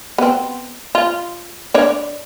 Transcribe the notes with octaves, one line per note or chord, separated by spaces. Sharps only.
B3 C4
F4
D4 C#5 D5